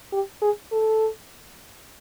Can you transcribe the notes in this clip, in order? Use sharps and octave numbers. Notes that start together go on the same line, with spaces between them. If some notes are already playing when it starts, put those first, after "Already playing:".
G4
G#4
A4